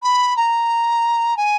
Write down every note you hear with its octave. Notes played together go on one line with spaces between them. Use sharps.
B5
A#5
G#5